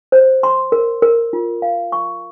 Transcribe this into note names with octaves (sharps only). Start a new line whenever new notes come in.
C5
C6
A#4
A#4
F4
F5
C#6